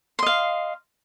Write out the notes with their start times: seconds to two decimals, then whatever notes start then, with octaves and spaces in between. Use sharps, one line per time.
0.19 C6
0.23 D#5
0.26 F5